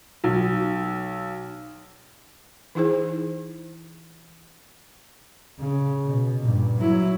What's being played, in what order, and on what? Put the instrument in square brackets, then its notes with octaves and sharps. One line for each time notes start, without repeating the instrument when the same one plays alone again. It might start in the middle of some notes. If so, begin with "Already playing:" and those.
[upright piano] B1
[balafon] E3 D#4 E4 G#4 C5
[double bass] C#3
B2
G2 A#2
F#3 E4